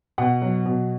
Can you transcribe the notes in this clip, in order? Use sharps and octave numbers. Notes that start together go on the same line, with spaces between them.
B2 F#5
F#3
B2